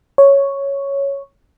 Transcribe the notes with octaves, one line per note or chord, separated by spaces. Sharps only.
C#5